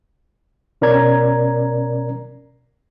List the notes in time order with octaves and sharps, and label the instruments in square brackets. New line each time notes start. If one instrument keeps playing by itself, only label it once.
[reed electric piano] B2 C#4 A#4 D5 A#5 G#6